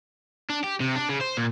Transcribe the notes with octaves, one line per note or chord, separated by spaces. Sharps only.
D4
G4
C3
D4
C#3
C5
A#2